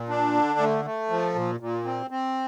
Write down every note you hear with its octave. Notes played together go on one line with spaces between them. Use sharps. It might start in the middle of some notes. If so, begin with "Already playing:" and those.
Already playing: A#2
D4
D3
A3
A3
F3
A#2
A#2
C4
C4